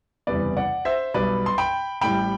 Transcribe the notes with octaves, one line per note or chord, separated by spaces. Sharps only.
F#1 E2 C3 E3 G3 B4 D5
D5 F#5
C5 E5
B1 B2 G3 B4 D5
C6
G5 B5
A1 A2 G3 G5 B5